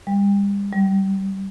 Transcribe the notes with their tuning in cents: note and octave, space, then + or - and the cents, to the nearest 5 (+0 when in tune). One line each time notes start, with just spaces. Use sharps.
G3 +35
G3 -20